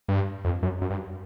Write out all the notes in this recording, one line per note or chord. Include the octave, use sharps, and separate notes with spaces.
G2
F2
F#2
F#2
G2